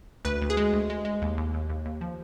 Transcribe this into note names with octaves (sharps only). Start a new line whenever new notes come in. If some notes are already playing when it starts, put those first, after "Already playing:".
D2 B4
D2
G#4
G#3
D2
G#3
G#3
D#2
D#2
D#2
D#2
D#2
F3